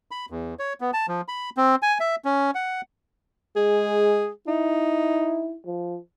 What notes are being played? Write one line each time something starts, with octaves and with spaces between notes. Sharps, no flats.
B5
E2
C#5
B3
A5
F3
B5
C4
G#5
E5
C#4
F#5
G#3 G#4
D#4 E4
F3